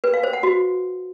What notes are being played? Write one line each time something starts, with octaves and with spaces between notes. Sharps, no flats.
B4
F5
C5
F#5
F#4